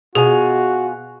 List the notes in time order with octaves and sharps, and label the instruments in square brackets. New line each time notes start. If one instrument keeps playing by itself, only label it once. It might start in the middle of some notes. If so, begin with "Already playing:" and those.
[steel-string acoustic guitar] B2 F4 G#5 [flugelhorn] F#4 [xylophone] G#4